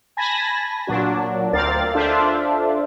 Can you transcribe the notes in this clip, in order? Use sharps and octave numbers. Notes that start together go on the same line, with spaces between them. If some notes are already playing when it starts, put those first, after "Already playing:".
G#5 A5 B5 G#6 A#6
A#2 F#3 D4 F#4
D2 C4 A#4 D5 F5 A6
D4 F4 A4 C5 E5